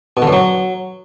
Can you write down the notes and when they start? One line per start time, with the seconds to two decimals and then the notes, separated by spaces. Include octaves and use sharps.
0.17 B2
0.22 D3
0.27 F#2
0.33 F#3